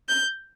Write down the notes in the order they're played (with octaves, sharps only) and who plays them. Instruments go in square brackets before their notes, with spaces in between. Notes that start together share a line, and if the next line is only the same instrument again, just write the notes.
[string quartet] G6